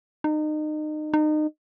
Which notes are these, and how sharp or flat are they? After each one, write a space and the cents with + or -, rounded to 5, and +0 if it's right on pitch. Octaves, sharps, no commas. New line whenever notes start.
D#4 -30
D#4 -30